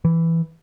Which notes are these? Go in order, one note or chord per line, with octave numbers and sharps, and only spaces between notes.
E3